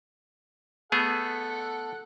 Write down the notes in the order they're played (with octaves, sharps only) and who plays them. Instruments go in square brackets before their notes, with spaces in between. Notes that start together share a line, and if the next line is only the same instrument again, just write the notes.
[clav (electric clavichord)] A3 B3 G#4 [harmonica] A4 F#5